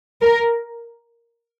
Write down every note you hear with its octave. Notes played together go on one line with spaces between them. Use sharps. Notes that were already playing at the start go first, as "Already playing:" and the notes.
A#4